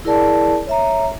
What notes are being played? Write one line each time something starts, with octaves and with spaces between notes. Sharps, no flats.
E4 G#4 A#4 D5 A5
C#5 E5 A#5